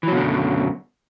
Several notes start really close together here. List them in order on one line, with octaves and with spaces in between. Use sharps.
E3 F#3 B2 D3 F#2